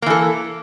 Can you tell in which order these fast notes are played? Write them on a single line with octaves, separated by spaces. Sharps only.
A#3 E3 A4